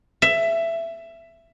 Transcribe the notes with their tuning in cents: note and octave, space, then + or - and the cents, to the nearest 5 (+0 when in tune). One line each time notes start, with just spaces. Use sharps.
E5 +15